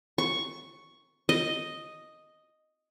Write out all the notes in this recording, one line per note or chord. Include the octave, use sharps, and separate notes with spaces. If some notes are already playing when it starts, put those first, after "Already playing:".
C#6
D#5